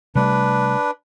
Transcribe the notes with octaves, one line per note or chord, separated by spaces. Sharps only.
C3 G3 A3 D4 B4